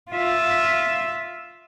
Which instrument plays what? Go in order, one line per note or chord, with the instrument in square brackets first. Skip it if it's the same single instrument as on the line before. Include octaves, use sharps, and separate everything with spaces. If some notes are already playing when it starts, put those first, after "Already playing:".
[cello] F4 E5